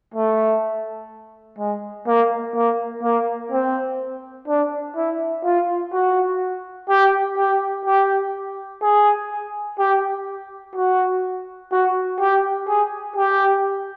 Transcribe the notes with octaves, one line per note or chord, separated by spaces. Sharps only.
A3
G#3
A#3
A#3
A#3
C4
D4
E4
F4
F#4
G4
G4
G4
G#4
G4
F#4
F#4
G4
G#4
G4